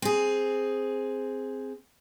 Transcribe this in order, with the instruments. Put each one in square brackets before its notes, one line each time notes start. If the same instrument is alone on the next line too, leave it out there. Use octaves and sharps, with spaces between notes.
[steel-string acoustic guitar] C4 G#4